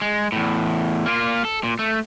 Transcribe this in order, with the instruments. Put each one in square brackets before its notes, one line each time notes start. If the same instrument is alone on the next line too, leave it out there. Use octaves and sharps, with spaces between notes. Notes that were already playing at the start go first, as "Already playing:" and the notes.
[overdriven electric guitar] G#3
E2 A2
A#3 F4
A4
A#2
A3